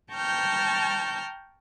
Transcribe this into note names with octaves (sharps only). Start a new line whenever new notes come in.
G5 A5 A#5 C#6 F6 G6